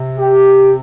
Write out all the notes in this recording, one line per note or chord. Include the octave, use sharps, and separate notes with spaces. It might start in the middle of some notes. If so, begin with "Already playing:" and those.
Already playing: C3
G4